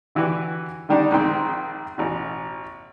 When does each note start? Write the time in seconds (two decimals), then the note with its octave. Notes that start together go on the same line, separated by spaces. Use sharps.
0.15 D3 E3 F#4 G4 B4
0.89 D3 D#3 G3 D4 D#4
1.12 A#1 D#3 G#3 C4 G5
1.98 A1 B2